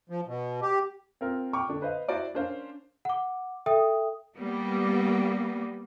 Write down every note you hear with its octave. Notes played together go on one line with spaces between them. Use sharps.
F3
B2
G4
C4 F4 A#4
G5 C#6 D6 F6
D3 D4
B4 C5 D#5 F5
E4 F#4 C5 D5 F5
C#4 D4 A#4 C5 F5
F#5 D6
A4 E5 G5 D#6
G3 A#3 B3